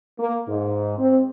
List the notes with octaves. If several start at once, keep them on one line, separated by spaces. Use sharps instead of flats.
A#3
G#2
C4